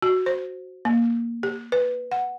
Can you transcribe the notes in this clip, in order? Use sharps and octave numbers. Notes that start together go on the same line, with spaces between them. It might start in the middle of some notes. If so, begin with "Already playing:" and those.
F#4
C5
A#3
G4
B4
F#5